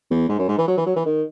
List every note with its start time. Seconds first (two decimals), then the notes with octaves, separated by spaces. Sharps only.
0.10 E2
0.29 G#2
0.39 F#2
0.48 G#2
0.58 E3
0.68 F#3
0.77 E3
0.86 F#3
0.96 E3
1.06 D#3